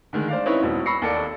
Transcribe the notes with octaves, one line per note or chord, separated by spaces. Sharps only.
D3 D#3 G#3
C5 D5 F5
C4 C#4 D#4 E4 B4 C#5
E1 F#4
B5 C#6 E6 A#6 C7 C#7
D#2 A#3 A4 D5 C#7